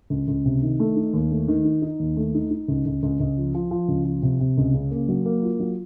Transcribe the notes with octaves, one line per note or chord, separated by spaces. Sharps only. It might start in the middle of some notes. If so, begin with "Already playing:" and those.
C#2
C#2
C3
D#3
A3
D#4
D#2
A3
D#3
D#4
D#4
D#2
A3
D#4
D#4
C#2
C#2
C#2
C#2
F3
F3
F3
C#2
F3
C3
C3
C#2
C#3
A#3
F#3
A#3
F4
F#3